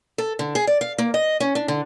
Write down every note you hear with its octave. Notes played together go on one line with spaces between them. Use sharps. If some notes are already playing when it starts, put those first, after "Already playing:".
A4
D3
G#4
D5
F5
A#3
D#5
C#4
D4
D3